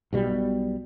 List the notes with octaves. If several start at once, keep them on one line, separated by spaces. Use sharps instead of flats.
B1 B2 G3